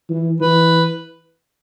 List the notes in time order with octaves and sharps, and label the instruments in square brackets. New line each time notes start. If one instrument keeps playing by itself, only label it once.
[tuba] E3
[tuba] E3 [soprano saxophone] B4